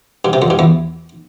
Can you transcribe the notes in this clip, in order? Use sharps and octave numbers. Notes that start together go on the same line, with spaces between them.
G2
C3
F2
G2
E2